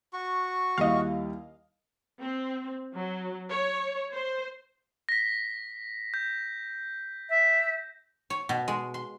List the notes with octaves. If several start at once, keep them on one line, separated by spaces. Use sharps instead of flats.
F#4 C#6
D#2 G3 E4 D#5 F5
C4
F#3
C#5
C5
A#6 B6
G6
E5
C#5
B2
G#3
C6